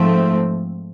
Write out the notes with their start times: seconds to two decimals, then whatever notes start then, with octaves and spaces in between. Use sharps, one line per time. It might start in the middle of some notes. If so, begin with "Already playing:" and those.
Already playing: G#2 F3 A3 C4